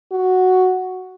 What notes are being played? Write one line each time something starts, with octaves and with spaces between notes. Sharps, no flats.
F#4